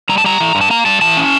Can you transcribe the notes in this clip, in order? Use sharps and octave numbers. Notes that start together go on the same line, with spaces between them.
G3 A#5
A5
G3 A#5
E3
G2
A5
A#3 A#5
G3 A5
E3 A5
C#4